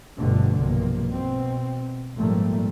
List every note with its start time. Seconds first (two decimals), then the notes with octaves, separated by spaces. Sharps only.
0.17 G1 G2 B2 D3 F3 A3
0.56 B1 G2 C3 F3 A#3
1.10 B2 C4
2.17 G#1 A#2 F3 G3 A3 A#3